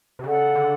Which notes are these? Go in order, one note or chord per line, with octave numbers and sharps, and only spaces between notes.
C3
C#3 A4 D5 F#5
D3